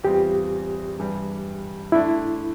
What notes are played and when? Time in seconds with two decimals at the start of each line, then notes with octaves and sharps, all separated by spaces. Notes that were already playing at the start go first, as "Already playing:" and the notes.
0.03 E2 E3 G3 C4 F4 G4
0.98 G2 E3 G3
1.92 D3 A3 D4 E4